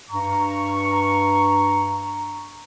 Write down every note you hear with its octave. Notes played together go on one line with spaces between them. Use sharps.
G2 A#5 C#6